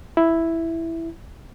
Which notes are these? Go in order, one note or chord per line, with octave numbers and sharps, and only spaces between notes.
E4